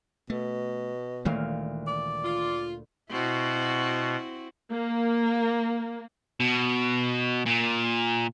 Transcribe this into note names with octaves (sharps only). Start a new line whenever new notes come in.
B2 A3
D2 A#2 D#3 E3 G#3 F5
D5
F4
B2 C4 E4 F#4
A#3
B2
A#2